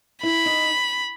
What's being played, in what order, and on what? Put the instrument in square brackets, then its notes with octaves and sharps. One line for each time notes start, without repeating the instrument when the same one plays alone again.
[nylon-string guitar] E4 [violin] B5
[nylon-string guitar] D#4